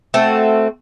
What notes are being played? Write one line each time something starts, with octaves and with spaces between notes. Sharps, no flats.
A3 C4 F#4